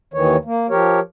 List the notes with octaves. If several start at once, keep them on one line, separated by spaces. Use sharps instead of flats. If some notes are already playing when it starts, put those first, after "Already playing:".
D#2 D#3 E3 C#5
A#3
F3 G4 A#4 C#5